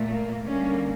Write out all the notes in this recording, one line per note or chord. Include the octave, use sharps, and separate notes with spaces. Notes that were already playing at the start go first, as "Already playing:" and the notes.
Already playing: A#2 A3
A#3
D3 G3 A#3 C#4